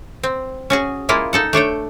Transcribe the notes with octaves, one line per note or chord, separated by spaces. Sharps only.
C4
C#4 F#4 G#4
G#3 A#3 E4 F4
D#4 A4 F#5
A3 D4 C#5 G5